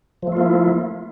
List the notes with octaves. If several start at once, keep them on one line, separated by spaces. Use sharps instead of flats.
F3 A3 A#3 E4 F4